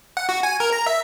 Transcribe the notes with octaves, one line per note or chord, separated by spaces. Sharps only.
F#5
F#4
G#5
A#4
A#5
E5